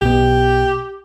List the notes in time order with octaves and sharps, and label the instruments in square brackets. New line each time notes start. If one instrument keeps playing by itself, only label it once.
[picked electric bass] B1 B2 [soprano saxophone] G4